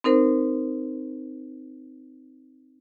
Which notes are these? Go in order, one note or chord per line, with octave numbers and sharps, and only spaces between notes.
C4 D#4 A#4 C5